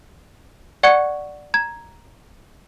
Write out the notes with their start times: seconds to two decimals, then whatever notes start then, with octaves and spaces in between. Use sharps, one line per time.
0.83 D5 F#5 C#6 F#6 G#6 C#7
1.54 A#5 G#6